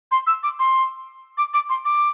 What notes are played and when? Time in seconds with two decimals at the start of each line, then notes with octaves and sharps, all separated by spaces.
0.11 C6
0.27 E6
0.43 D6
0.59 C6
1.38 D6
1.54 D6
1.70 C6
1.85 D6